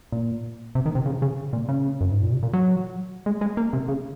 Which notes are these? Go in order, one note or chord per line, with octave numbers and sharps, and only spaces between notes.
A#2
C3
D#3
C3
C#3
C#3
A#2
C#3
F#2
G#2
A#2
C3
A#2
F#3
G#3
G#3
A#3
C3
C#3